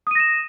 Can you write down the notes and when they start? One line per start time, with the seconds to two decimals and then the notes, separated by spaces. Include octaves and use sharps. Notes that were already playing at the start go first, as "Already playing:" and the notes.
0.07 D#6
0.11 D#7
0.15 A#6
0.20 E7